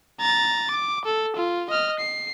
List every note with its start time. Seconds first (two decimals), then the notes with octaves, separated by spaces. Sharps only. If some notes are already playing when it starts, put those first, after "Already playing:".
0.20 A#5 A6
0.71 D6
1.05 A4
1.36 F4
1.70 D#5 F6
2.00 C7